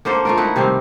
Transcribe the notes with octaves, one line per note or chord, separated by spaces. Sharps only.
D3 A#3 A4 C5
A3 F4 A#4
D#4 E4 F#5
C3 D#3 G3 C4